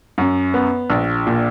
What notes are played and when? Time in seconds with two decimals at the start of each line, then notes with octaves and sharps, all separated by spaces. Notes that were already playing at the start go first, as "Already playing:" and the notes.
0.18 F#2
0.54 B3
0.90 A#1
1.27 A#2